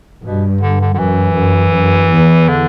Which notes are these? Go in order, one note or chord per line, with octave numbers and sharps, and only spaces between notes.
G2 B2
D3
D3
D3
F#2 E3
F#2
F#2
E2
D3